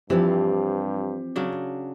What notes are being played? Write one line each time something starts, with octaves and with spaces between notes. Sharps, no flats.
G2 E3 F3 C4 G4
C#3 F#3 D4